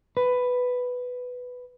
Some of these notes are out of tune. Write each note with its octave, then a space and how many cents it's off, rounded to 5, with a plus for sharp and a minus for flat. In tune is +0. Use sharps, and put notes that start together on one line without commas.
B4 +5